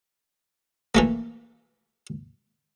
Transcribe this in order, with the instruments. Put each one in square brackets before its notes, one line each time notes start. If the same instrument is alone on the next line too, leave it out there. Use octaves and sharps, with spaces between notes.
[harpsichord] E3 A3 A#3